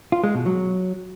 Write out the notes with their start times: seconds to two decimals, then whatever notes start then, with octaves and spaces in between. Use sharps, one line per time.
0.12 F4
0.24 G#3
0.35 B2
0.46 F#3